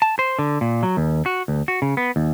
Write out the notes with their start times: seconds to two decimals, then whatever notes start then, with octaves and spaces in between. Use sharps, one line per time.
0.02 A5
0.19 C5
0.39 D3
0.61 A#2
0.83 F#3
0.97 D#2
1.26 F#4
1.48 D2
1.68 F#4
1.82 C#3
1.97 B3
2.16 D#2